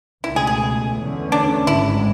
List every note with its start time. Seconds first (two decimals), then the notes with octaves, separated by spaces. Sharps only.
0.24 C#2 B2 A3 E4
0.36 G#4
0.47 G#4
0.96 E2 D3 A3 C#4
1.32 D4
1.67 G#1 G#2 G#3 E4